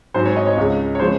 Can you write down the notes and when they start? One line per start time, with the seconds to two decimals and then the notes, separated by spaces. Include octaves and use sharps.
0.14 G#2 F#3 C5
0.25 C#5
0.36 D#5
0.46 C#5
0.57 C#2 C#3 G#3
0.95 C#5
0.99 C#3 F3 G#3 C5